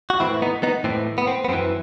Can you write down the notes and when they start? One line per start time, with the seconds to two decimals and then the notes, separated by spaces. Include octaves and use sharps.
0.10 F#4
0.20 A2 E3 C4 E4
0.42 B3 D#4
0.63 B3 D#4
0.84 A2 E3 C4
1.18 B3
1.27 C4
1.45 B3
1.48 F#2 C4
1.53 E3